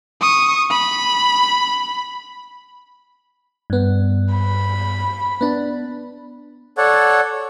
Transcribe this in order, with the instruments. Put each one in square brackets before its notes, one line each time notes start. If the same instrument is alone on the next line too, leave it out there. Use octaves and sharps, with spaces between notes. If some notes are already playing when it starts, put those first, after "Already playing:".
[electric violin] C#6 D#6
B5
[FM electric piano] G2 B3
[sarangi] B5
[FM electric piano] B3 D4
[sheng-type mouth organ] A4 C#5 D5 F#5